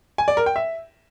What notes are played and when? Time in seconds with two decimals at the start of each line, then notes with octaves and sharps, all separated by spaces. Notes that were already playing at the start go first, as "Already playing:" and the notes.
0.18 G#5
0.28 D5
0.37 A#4
0.46 G5
0.56 E5